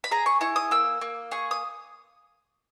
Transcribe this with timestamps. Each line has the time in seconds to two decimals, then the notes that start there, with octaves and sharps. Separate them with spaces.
0.04 B5
0.11 G#4 A#5
0.26 C#6
0.41 E4 C#6
0.56 D#6
0.71 A#3 E6
1.01 A#3
1.31 G#4 C#6
1.51 D#6